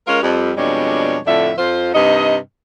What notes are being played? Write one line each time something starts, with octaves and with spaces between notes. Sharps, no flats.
G#3 C#4 F4 A#4
F2 G3
F2 B2 G3 G#3 D4 C#5
F2 A2 D3 D4 E5
F2 F4 C5
G2 C3 D#4 D#5